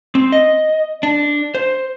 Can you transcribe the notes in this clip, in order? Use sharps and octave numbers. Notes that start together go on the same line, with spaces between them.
C4
D#5
D4
C5